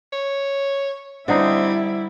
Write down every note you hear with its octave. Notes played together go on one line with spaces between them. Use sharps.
C#5
D3 G3 C4 D#4 E4